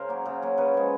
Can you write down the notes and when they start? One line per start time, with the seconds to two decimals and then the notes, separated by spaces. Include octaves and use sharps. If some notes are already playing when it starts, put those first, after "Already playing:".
Already playing: C#3 A#4 C5
0.09 F#3 A#3
0.26 C#3
0.42 F#3 A#3
0.58 C#3 B4 C#5
0.74 F3 G#3